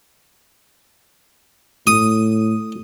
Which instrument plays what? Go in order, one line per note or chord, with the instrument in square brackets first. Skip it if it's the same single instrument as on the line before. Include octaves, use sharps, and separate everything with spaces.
[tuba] A2 [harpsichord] D#6